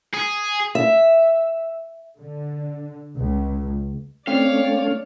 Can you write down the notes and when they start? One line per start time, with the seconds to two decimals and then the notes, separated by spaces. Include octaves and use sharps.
0.13 G#4
0.75 E5
2.17 D3
3.15 C#2
4.27 A3 C4 C#4 C#5 D5 F5